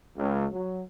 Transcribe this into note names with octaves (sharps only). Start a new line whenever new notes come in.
C#2
F#3